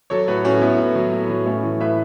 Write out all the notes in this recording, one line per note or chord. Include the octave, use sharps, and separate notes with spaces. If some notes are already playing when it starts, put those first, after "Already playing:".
F#3 A4 C#5
A2 F#4 B4
A2 C#4 F#4
A2 B3 E4
A2
F#3
A2
F#3
A2 A3 C#4
E3
A2 B4 E5